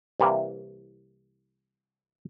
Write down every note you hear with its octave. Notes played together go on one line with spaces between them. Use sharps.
C2 C3 E3 A#3